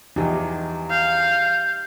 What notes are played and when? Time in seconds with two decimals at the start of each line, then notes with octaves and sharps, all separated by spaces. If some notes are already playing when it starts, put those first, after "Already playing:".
0.16 E2 E3 F3 D#4 G4
0.90 F5 G6